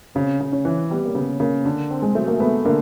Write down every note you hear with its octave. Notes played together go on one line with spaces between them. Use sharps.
C#3 C4
C#3
C#4
E3
C#4
G3 B3
A#3
C#3 B3
C#3 A#3
D3
C4
G#3
F#3 A3
A#3
A3 B3
D3 A#3